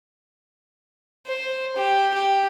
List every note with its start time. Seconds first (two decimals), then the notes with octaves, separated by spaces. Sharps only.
1.27 C5
1.76 G4
2.14 G4